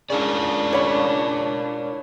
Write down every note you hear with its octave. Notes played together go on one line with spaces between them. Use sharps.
C#3 D4 E4 A#4 D5
C#5 B5